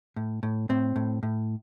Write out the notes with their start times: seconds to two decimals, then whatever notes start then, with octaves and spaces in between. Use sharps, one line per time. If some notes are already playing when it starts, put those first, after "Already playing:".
0.16 A2
0.43 A2
0.69 A2 C4
0.96 A2
1.23 A2